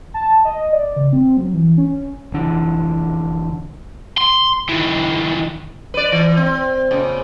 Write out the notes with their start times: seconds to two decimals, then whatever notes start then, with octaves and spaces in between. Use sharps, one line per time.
0.14 A5
0.45 D#5
0.73 D5
0.96 C#3
1.13 C4
1.37 F#3
1.54 E3
1.77 C#4
2.32 F1 D3 E3
4.18 C6
4.69 D#3 E3
5.94 B4 D5
6.12 E3
6.37 C4
6.91 A#2 C#3